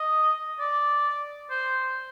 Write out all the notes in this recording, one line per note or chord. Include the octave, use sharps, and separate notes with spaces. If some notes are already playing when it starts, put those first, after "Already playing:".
Already playing: D#5
D5
C5